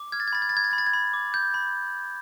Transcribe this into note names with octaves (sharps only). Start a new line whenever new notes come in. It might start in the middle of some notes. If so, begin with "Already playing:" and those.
Already playing: D6
F6 G#6
A6
G#6
B5 A6
G#6
A6
B5 G#6
A6
B5 G#6
A6
G#6
B5
D6
G6
B5